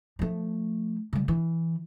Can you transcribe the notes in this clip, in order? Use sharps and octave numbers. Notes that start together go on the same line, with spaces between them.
F3 A3
C#3 G3
E3